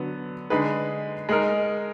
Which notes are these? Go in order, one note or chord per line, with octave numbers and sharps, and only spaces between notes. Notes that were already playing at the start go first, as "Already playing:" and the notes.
Already playing: D3 F#3 B3
D3 G#3 D#4 G#4 B4
G#3 D#4 A#4